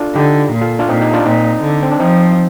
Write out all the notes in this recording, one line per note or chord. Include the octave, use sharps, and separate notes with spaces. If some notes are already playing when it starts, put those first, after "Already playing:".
Already playing: D4 F4 A4
D3 D#4 G4
A#2
F4 A4
D4 F4
A#2 C4 D#4
D#4 G4
D4 F4
A#2 C4 D#4
D3
C4
D4
F3 C4 D#4